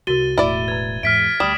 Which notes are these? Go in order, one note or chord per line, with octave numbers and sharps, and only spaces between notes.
C2 F#4 A#4 A6 D#7 G7
E1 A2 E4 D5
B4 A#5 G#6
E2 G#2 E5 F6 B6 D7
D2 G3 D6 D#6 E7